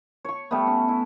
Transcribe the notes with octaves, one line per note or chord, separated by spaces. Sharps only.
C#5 C#6
G3 A3 B3
C#4
E4